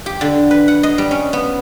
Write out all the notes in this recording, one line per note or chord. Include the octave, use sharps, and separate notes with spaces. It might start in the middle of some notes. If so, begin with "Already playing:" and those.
G4
D3
B4
F#5
D#5
G3
C#4
B3